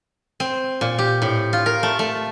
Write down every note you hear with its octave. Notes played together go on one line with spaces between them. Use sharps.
C4
A#2
G4
A2
F4
A#4
A3
A3